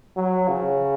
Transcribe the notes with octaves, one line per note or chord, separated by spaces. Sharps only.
F#3
C#3